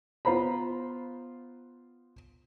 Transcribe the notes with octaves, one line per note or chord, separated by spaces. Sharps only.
B3 F4 C5 A#5 B5